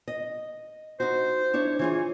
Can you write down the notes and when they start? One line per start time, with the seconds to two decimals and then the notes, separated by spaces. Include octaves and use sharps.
0.08 D#5
1.00 D#4 F#4 C5
1.54 D4 E4 C#5
1.79 E3 F4 G#4 C#5